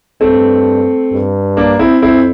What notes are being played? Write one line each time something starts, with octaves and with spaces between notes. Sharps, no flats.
G2 A3 C4
G2
A#3 D4
C4 E4
F2 C4 E4